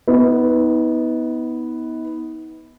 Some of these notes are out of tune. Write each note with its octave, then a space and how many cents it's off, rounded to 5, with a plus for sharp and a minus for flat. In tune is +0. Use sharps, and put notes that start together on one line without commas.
B3 +0 D#4 +40